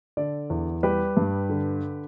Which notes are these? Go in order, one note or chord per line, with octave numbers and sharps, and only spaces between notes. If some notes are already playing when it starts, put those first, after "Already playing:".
D3 A4 D5
E2
G3 G4 B4
G2
D3